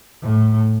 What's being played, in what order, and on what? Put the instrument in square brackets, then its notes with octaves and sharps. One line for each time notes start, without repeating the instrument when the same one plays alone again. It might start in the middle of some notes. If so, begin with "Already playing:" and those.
[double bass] A2